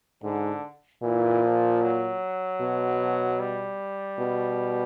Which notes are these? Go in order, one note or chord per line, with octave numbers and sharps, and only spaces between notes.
G#2 D3
A#2 E3
F3
F#3
B2
G3
B2